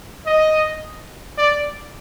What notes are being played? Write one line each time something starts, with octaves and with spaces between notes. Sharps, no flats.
D#5
D5